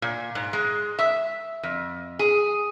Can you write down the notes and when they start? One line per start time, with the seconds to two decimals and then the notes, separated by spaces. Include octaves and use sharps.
0.02 A#2
0.35 G#2
0.53 G#3
0.99 E5
1.63 F2
2.19 G#4